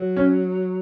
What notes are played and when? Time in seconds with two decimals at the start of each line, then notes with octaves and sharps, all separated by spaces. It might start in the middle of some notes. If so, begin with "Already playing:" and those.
Already playing: F#3
0.17 C#4